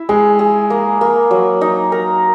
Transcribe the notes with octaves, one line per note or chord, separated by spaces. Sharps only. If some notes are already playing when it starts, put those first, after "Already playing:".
Already playing: E4 E5
G#3 G#4
G#4
A#3
A#3
F#3
D#4
A#4